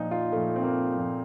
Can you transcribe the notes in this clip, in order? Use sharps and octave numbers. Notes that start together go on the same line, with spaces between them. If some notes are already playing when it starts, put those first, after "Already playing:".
Already playing: A#2 F3 D#4
F4
A#2 F3 A3
C4
A#3
F3
A#2